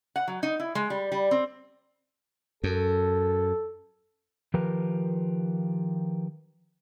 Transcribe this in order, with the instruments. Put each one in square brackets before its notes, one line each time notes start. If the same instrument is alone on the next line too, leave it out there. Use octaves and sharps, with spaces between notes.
[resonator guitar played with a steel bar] F#5
F#3
D#4
E4
G#3
G3
G3
C4
[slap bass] F#2 [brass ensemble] A4
[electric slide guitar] D#3 F3 G4 A#4 B4